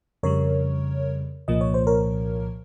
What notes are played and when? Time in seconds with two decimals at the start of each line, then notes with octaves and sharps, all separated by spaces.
0.23 F2 C#3 G3 A#4 C#5
1.48 C2 A#2 F3 A#3 D#5
1.61 C#5
1.74 C5
1.87 A#4 C#5